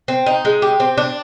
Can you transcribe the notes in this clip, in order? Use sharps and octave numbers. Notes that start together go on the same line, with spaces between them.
C4
D#4
G#3
G4
C4
D4